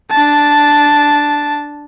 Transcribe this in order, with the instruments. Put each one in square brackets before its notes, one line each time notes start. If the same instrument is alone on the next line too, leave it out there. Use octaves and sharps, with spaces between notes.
[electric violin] D4 A5